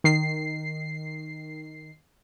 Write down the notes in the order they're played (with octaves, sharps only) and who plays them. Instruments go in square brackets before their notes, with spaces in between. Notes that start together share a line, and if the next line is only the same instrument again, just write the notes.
[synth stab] D#3 C7